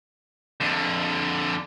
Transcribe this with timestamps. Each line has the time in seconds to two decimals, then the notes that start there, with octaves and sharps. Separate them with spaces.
0.60 F2 D3